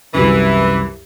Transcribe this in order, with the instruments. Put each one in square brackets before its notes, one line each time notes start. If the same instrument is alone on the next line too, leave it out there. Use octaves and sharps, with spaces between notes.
[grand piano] C2 F#2 [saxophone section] E3